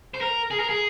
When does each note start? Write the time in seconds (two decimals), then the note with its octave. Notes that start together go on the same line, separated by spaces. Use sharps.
0.14 C5
0.21 A#4
0.51 G#4
0.60 A#4
0.69 G#4